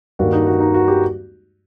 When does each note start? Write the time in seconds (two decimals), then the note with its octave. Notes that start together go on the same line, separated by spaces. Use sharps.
0.19 G2 D#3 G3 A#3 F#4
0.33 D#4
0.46 F#4
0.60 D#4
0.74 F#4
0.88 G4